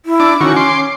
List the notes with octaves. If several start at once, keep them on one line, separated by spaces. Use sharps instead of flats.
E4
D4 D6
D#3 C#4 F#4 C#6
C6 D6